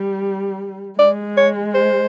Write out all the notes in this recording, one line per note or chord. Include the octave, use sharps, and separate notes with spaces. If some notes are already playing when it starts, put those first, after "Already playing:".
Already playing: G3
G#3 D5
C#5
C5